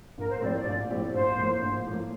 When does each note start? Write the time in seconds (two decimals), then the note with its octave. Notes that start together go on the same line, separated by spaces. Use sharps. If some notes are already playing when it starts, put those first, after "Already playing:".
0.18 A#1 A#4
0.29 C5
0.41 A2 F3 C4 G4 D5
0.54 D5
0.66 A#1
0.90 A2 F3 C4 G4
1.14 A#1 C5
1.38 A2 F3 A#3
1.62 A#1
1.86 A2 F3 A#3